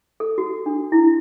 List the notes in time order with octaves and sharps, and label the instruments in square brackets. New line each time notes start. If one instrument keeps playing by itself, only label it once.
[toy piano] A4
F#4
D4
E4